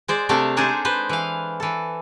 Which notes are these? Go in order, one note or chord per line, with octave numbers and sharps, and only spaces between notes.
G#3 C5 D5
C3 A3 D4 A4 C5 F5
G#3 D4 D#4 G#4 A4 C5
B4 C5
E3 F5
E3 A4